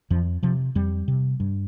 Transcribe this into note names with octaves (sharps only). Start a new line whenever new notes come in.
F2 F3
C3 F3
F2 G3
C3
G2